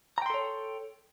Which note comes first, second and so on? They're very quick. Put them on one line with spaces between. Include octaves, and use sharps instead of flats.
A#5 G5 C6 A4 C#5